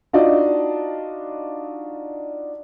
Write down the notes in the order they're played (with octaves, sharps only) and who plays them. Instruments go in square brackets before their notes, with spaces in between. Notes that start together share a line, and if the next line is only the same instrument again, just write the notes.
[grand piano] D4 D#4 F4 F#4 D5 D#5